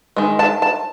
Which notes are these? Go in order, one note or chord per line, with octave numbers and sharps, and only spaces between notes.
D#3 G#3
A5
A5